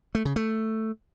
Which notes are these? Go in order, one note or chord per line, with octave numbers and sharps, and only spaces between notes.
A3
C#3
A3